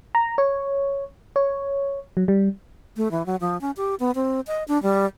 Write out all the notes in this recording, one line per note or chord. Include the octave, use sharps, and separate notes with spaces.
A#5
C#5
C#5
F#3
G3
A3
E3
F#3
F3
C#4
G4
B3
C4
D#5
D4
G3